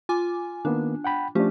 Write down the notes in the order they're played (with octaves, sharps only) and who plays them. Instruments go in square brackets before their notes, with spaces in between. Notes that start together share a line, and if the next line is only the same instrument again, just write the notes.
[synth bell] F4 G#5 D6
[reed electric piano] D#3 A#3 B3 [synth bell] D4
[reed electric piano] F#5 G5 B5
[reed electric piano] F3 D4 [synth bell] A3 C#4 G4